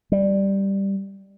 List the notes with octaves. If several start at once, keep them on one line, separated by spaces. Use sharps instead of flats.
G3